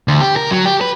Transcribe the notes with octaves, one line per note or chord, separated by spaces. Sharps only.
D2
G4
A#4
F#3
G4
B4